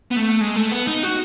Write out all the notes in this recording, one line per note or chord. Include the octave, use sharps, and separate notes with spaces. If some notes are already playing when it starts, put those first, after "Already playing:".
B3
A3
G#3
A3
B3
D#4
F#4